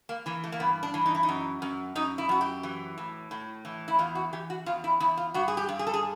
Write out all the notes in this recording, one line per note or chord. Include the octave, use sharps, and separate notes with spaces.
A#3
E3 A#3
A3
A#3
G2 B3
D4
E3
D#4
E4
D#4
F#2
F#2
F#2 D#4
E4
F#2 F#4
G4
E3
A2
A2
E3
E4
E2 F4
F#4
E3 G4
F#4
E2 F4
E4
E2 E4
F4
G2 F#4
G#4
G4
G2
G#4
A4
G#4